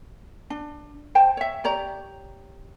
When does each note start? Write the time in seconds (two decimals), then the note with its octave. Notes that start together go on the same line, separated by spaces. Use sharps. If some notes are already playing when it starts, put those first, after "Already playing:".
0.50 D4
1.15 C5 G5 A5
1.37 C#5 E5
1.64 G4 C#5 D5 A#5